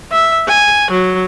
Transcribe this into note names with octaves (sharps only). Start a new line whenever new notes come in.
E5
G#5
F#3